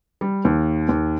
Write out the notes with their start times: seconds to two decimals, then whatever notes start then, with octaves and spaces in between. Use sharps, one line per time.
0.21 G3
0.45 D#2
0.89 D#2